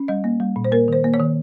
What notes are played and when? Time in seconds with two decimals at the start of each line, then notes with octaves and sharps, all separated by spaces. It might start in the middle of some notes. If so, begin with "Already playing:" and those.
Already playing: C#4
0.08 G3 D#5
0.24 A#3
0.40 G3
0.56 A#2
0.64 C5
0.72 A#3 A#4
0.88 D#3 C5
1.04 A#3
1.14 C#5
1.19 D#3